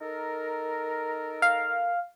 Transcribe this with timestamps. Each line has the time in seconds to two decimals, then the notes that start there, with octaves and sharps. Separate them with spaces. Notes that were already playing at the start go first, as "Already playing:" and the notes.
0.01 D#4 A4 A#4
1.42 F5